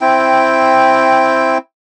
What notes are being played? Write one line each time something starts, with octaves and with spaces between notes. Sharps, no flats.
C4 E4 G5